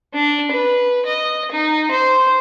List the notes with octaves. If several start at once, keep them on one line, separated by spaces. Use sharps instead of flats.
D4
B4
D#5
D#4
C5